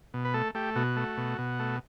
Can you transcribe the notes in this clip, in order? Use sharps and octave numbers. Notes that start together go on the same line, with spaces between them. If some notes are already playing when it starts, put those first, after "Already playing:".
B2
B4
A3 A4
A3 G4
B2 F#4
A3
B2
B2
A3